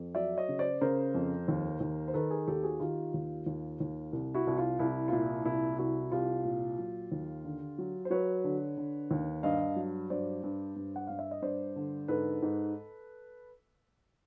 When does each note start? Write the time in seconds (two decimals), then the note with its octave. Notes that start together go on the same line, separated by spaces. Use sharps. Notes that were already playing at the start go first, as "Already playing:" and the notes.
Already playing: F2
0.15 F#3 D5 E5
0.37 C#5 D#5
0.49 C#3
0.59 C5 D5
0.81 C#3 A#4 C5
1.14 F2
1.48 D#2
1.80 D#2
2.08 C5
2.14 D#3 A4 B4
2.30 G#4 A#4
2.47 D#2 G4 A4
2.63 F#4 G#4
2.80 D#3 F4 G4
3.14 D#2
3.46 D#2
3.80 D#2
4.13 C2
4.34 E4 F#4
4.47 C2 E4
4.58 F4
4.79 C2 E4
5.08 F4
5.13 A#2 E4
5.45 C2 E4
5.78 C2 E4 F#4
6.12 C2 F4 G4
6.45 A#2
6.78 F#3
7.12 D#2
7.45 D3
7.78 F#3
8.05 C5
8.10 F#3 B4 C#5
8.44 D3
8.77 D3
9.11 D#2
9.43 G2 D#5 F5
9.76 F#3
10.10 G2 C5 D5
10.43 G2
10.76 G2
10.96 F#5
11.07 G2 F5
11.19 E5
11.31 D#5
11.42 G2 C5 D5
11.76 D3
12.08 G#2 A4 B4
12.42 G#2